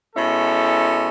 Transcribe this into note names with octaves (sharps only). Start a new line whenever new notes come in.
B2 G#3 C#4 E4 A4